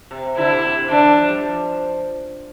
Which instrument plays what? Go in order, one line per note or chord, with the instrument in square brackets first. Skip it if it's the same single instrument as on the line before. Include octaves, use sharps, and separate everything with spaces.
[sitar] C3
[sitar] D3 [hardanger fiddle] E4
[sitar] C3
C3
C3
[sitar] D3 [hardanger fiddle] D4
[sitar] E3
F3
G3
F3